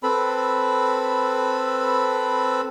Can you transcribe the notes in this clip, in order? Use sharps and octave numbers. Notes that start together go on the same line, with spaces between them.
C4 A4 B4 B5